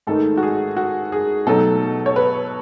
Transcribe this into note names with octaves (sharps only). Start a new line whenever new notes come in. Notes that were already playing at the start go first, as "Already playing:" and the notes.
G#2 D#3 A3 D#4 A4
F#4
G#4
F#4
G#4
B2 F#3 A3 D#4 A4
C#5
B4